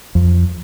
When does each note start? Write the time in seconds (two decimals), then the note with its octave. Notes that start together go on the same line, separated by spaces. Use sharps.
0.15 F2